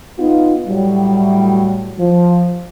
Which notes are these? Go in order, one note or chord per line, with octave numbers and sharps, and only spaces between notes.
B3 D#4 F4
A2 F#3 G3
F3